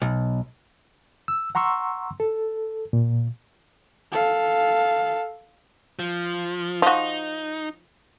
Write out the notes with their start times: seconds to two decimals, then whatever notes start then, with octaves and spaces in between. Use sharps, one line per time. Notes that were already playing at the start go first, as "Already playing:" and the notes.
0.02 B1
1.28 E6
1.55 F#5 A#5 C6 C#6 E6
2.20 A4
2.93 A#2
4.12 A4 F5
5.99 F3
6.82 F3 D#4 F#4